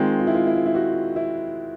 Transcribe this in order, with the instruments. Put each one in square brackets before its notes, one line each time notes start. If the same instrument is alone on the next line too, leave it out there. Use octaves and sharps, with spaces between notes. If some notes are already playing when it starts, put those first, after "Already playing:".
Already playing: [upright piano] D#3 G#3 C4 [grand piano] F4
[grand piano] F4
E4
F4
E4
F4
E4
F#4
E4